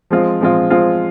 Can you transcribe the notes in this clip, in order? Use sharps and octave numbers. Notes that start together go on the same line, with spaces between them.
F3 G#3 C4 F4
F3 G#3 C4 F4
F3 G#3 C4 F4